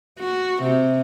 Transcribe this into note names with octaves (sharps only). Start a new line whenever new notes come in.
F#4
C3